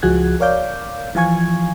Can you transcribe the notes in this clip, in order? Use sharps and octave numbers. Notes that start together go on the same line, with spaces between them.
C#2 F3 F#4 G#4 F#6 G#6
A#4 C#5 D5 F5 D6 G6
E3 F3 F5 G#5 C#6 G#6